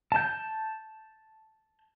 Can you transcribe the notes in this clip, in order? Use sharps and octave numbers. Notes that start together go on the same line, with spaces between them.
A5 G6